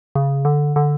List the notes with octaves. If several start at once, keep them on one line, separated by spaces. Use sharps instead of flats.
C#3
D3
D3